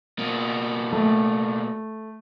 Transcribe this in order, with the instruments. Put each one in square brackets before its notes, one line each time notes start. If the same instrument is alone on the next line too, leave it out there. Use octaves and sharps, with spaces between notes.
[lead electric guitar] B2 A#3
[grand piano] A3